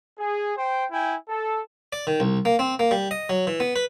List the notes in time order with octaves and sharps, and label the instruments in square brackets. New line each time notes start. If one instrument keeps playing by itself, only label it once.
[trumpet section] G#4
C5 G5
E4 G5 G#5
A4
[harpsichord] D5
D#3
C2
A#3
C4
A#3
G3
D#5
F#3
E3
B3
B4